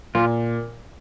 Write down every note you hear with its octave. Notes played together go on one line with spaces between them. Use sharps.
A#2 F4